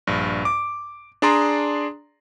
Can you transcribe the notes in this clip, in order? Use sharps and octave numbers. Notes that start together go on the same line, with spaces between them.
A#1 G2
D6
D4 G#4 D5 A#5 C6 D#6